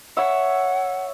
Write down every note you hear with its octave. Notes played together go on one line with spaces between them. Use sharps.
C#5 E5 F#5